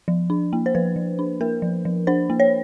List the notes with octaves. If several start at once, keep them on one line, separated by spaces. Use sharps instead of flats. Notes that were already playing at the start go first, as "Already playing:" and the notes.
F3
D4
A#3
C5
F3 B4
F3
D4
A#3 A#4
F3
F3
D4 C5
A#3
C#5